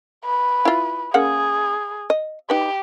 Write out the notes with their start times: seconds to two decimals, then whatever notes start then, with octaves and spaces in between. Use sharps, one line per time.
0.25 B4
0.65 E4 F4
1.14 C#3 A#3 G#4 F#5
2.10 D#5
2.50 D#4 G4 B4